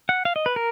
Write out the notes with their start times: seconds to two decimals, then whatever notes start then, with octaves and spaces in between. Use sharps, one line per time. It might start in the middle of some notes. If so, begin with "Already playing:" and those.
0.09 F#5
0.25 F5
0.36 D#5
0.46 B4
0.56 A#4